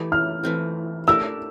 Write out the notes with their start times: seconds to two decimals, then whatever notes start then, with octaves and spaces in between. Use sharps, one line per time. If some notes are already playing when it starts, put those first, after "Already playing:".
Already playing: E3 A3 E4 G4
0.12 F6
0.43 E3 A3 C4
1.07 A3 D4 G4 A#4 E6